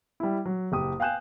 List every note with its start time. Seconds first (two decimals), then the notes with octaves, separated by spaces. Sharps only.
0.20 G3 E4
0.45 F#3
0.72 F#1 G4 D#6
1.00 F5 G5 G#5 F#6 G6 E7